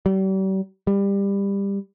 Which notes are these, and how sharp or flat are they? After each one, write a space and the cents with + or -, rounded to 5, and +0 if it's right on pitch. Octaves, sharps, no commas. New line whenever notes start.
G3 -40
G3 +20